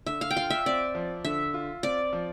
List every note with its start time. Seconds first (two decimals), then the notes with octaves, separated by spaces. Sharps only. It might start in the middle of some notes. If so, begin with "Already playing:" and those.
0.06 D3 E5
0.21 F5
0.31 G5
0.36 F4 F5
0.50 E5
0.66 C4 D5
0.95 F3
1.24 D3 E5
1.54 F4
1.83 C4 D5
2.13 F3